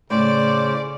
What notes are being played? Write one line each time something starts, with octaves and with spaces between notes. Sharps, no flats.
A2 C#3 C#4 C5 D5